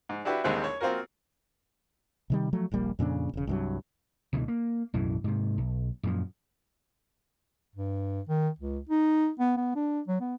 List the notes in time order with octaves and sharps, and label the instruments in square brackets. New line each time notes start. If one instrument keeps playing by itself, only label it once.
[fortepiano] G#2
D4 E4 F#4 G4 B4
A#1 D#2 G3 G#3 C4 F#6
C#5
A#3 C4 F4 F#4 A#4
[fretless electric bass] C3 D#3 G3
F3 F#3 A3
D#1 A#1 G3 A#3
F2 A#2 C#3 D4
E1 C#3
C2 G2 F#3
[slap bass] C#2 B2 D3 E3
A#3
B1 F#2 A2 E3
G#2 C3
B1
F#2 A#2 F3
[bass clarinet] G2
D#3
C#2
D#4
B3
B3
D4
F#3
B3